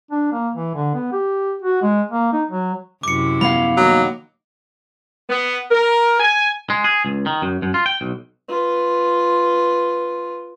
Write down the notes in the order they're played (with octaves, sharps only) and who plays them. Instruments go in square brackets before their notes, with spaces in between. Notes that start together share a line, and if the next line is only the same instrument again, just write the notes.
[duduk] D4
A#3
E3
D3
B3
G4
F#4
G#3
A#3
D#4
F#3
[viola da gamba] F#2 C3 E4 [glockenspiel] D6 C#7
[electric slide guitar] F3 B3 F5 [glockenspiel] B5
[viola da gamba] D#3 A#3 D#4 [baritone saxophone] F#3
[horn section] B3
A#4
G#5
[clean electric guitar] G#3
G#4
C#2
D#3
F#2
F#2
F4
G5
B1
[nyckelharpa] F4 B4